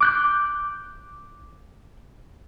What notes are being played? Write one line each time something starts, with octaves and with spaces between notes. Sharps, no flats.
D6 F#6 G6